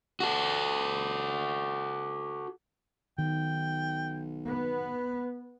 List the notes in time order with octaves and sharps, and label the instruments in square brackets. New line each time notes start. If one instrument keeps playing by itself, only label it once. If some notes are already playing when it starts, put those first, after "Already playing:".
[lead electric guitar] F#4 A4
[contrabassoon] B1 [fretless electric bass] D#3 [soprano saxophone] G5
[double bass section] B3 [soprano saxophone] B4